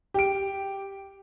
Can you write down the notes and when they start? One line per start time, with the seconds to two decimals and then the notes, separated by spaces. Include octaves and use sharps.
0.14 G4 D7